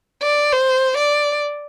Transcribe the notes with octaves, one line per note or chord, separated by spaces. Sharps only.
D5
C5
D5